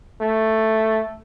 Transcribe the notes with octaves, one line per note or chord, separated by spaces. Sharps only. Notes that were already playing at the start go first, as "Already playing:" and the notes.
A3